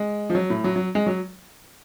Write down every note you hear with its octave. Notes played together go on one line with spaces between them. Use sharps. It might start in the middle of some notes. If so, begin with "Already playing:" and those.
Already playing: G#3
F3
F#3
A2
F#3
F#3
G#3
F#3